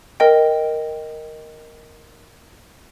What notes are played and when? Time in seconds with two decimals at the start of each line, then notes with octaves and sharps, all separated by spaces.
0.20 A#4 D#5 G5